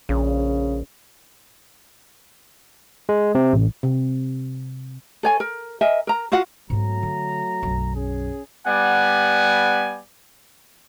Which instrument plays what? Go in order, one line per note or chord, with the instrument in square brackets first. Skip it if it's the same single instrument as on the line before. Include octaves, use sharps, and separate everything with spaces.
[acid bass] A#1 [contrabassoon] C#3
[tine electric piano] G#3
C3
A1
[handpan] C3
[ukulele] A4 C#5 G#5
A#4
A#4 D#5 E5 G#5
A#4 A#5
F4 F#4 F5 F#5
[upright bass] G#2 B3 [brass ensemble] F#3 A3 A#5
[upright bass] D3
B1 F#2
[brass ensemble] C#4 G#4
[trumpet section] G3 B3 D5 F#5 G#5